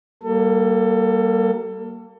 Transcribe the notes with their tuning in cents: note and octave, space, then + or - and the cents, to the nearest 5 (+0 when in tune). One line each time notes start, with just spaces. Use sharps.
G3 -35 A#3 +0 A4 +25